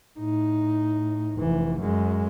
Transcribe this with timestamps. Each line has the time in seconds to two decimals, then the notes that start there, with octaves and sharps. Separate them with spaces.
0.19 A2 D#4
1.36 F1 E3
1.80 F#2 G#3